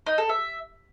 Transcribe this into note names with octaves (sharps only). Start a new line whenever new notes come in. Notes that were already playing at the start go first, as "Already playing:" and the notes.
D#4
A4
E5